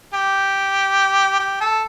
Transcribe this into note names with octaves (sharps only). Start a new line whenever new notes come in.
G4
G4
A4